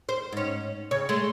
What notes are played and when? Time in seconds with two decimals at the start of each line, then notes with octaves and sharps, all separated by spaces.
0.09 C5
0.32 G#2 C#4
0.91 C#3 C#5
1.09 G#3 A3